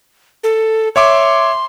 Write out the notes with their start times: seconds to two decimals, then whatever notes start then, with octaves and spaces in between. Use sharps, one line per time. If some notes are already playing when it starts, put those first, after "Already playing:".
0.44 A4
0.96 C#5 E5 C6 D6